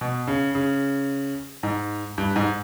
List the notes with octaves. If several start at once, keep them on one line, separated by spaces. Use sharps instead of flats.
B2
C#3
C#3
G#2
G2
G#2